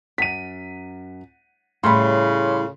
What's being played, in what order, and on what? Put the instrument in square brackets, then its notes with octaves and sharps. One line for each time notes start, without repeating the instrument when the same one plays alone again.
[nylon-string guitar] F#2 [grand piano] B6 D#7
[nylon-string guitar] A2 G3 [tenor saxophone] C#3 [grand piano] B5 C6